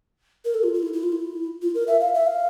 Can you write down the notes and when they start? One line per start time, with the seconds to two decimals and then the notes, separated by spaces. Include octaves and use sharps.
0.45 A#4
0.54 A4
0.64 F4
0.74 F4
0.83 E4
0.93 E4
1.03 F4
1.12 E4
1.62 F4
1.75 A#4
1.88 E5
2.01 F5
2.14 E5
2.27 F5